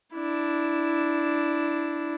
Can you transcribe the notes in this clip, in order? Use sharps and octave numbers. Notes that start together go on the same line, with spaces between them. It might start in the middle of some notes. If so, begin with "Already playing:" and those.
D4 E4